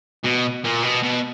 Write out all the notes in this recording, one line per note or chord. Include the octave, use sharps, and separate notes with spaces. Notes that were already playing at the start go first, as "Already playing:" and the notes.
B2
A#2
B2
B2